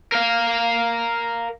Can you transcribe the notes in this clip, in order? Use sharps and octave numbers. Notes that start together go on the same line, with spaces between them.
A#4 F5